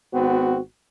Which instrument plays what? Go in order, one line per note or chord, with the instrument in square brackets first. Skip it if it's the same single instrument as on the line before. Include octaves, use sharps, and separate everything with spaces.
[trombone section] G#1 B3 C4 [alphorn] F#4